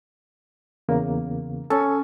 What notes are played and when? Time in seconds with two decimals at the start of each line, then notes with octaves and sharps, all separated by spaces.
0.89 E2 C#3 A#3
1.70 C#4 A4